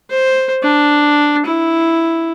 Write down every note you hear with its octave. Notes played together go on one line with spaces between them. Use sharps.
C5
D4
E4